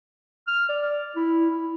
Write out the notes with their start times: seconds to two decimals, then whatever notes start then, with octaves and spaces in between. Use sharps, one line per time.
0.47 F6
0.69 D5
1.16 E4
1.50 E4